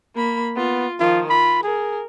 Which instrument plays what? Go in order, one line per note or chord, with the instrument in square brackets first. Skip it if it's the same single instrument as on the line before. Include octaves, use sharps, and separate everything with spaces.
[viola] A#3 B5
[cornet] B3 [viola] F4
[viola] D#3 F3 [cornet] F4
[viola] F4 [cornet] B5
[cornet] G#4 [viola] A#4